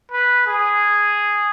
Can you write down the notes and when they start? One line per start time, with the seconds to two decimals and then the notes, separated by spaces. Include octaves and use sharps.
0.12 B4
0.47 G#4